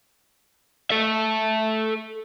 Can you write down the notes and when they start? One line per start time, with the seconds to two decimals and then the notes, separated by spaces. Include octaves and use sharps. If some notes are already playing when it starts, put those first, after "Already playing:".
0.90 A4 E5